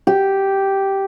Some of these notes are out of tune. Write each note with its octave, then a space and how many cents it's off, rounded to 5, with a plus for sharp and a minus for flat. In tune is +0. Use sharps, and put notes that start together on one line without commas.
G4 -5